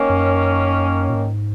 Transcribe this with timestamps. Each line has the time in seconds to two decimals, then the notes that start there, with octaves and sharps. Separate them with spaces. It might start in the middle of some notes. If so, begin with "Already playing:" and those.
Already playing: D#3 A#3 C#4
0.10 F#2
1.09 A#2
1.15 G#2